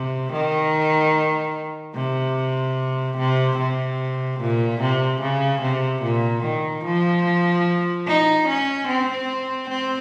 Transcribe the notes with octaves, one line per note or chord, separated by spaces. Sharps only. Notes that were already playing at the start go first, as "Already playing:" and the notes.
Already playing: C3
D#3
C3
C3
C3
A#2
C3
C#3
C3
A#2
D#3
F3
D#4
C#4
C4
C4